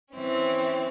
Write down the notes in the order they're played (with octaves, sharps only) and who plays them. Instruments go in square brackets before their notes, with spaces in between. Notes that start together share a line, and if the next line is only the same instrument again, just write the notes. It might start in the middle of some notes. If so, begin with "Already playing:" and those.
[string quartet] E3 C4 C#4